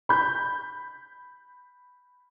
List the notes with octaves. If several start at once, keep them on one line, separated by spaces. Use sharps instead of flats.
B5 G6